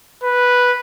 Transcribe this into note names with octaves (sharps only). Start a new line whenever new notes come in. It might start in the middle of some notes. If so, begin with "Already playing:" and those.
B4